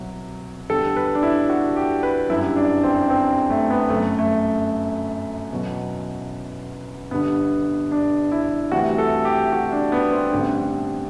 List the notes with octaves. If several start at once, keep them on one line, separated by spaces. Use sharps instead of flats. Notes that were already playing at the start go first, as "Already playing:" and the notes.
Already playing: C2 B2 F#3
E2 D3 G3 A4
B4
D4
E4
F#4
G4
B4
G1 F#2 D3 G3 E4
D4
C4
C4
A3
B3
G1 F#2 F#3 A3
A3
E2 B2 F#3
G1 G2 D3 B3
D4
E4
D2 C3 E3 G3 F#4
A4
G4
F#4
D4
B3
C4
A1 G2 D3